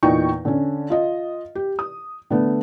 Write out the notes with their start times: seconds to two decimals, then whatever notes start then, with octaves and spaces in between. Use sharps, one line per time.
0.03 E2 A#2 D#4 G5 C#6
0.45 D3 C#4
0.90 F4 D#5
1.55 G4
1.79 D#6
2.30 D3 A3 B3